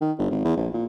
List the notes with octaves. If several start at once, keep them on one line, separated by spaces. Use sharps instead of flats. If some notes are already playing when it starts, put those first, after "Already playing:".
D#3
G1
G#1
E2
A#1
A#2